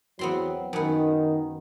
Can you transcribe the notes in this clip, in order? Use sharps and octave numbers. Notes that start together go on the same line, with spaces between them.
E2 F#3 B3 C4 C6
F#2 D#3 B3